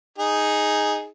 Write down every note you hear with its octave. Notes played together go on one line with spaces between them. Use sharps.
D#4 G#4